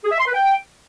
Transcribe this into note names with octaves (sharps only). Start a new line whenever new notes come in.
G#4
E5
C6
B4
G5